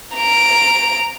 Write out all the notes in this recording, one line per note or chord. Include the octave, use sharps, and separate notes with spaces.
A#5 D7